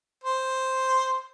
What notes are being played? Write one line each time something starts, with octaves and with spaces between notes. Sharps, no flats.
C5